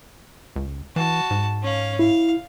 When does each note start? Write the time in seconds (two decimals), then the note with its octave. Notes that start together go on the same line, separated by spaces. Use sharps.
0.56 C#2
0.96 E3 F#4 A5
1.31 G#2
1.63 C#4 F5
1.99 E4 F5